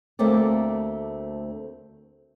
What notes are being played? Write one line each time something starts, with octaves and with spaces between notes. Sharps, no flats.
D2 A3 A#3 C4 D5